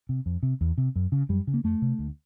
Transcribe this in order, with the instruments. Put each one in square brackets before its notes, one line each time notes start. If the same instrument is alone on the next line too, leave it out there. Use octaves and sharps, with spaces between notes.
[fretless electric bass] C3
F2
C3
E2
C3
F#2
C#3
F#2 G3
C#3
A#3
F2 A3
C3
D2